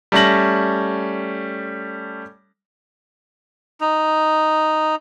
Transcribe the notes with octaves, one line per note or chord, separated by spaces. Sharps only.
G3 A3 C#4 A5 A#6 F#7
D#4